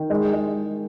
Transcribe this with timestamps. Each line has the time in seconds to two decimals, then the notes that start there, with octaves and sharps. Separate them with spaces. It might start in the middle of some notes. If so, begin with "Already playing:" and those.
Already playing: D#3
0.10 G#3
0.33 G#3